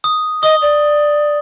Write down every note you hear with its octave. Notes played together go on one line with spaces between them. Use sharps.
D#6
D#5 D#6 G7
D5